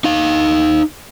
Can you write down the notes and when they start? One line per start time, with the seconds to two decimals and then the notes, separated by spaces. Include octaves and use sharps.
0.04 D#4 F5